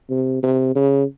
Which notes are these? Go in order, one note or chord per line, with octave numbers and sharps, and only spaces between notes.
C3
C3
C#3